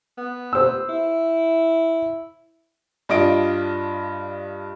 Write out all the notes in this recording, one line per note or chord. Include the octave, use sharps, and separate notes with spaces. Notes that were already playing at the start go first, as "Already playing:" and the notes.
B3
C5 E6
E4
G2 D4 F4 D#5 D7